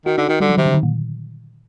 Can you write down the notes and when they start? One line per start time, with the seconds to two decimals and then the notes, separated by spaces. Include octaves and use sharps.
0.06 D#3 F#4
0.17 D3 D#4
0.29 D#3 F#4
0.40 D3 G3
0.50 F#3
0.57 C3 D#3
0.66 D3
0.74 D#3
0.83 A#2